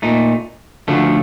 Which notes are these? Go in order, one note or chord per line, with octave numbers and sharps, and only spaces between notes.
A#2 A3 D#4
D2 D3 F3 A3